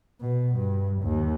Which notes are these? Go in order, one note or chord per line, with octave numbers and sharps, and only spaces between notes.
B2
G2
D#2